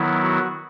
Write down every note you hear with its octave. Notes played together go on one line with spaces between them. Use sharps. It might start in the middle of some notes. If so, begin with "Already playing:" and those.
Already playing: D#3 F#3 B3 E4
F#4